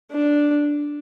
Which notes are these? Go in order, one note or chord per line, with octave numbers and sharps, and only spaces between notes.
D4